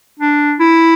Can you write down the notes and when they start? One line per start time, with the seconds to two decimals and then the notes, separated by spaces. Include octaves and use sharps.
0.20 D4
0.60 E4